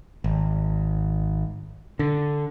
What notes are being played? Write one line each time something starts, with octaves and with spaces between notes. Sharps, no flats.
G#1
D3